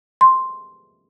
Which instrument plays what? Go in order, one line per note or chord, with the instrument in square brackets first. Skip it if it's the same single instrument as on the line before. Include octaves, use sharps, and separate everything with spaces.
[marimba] C6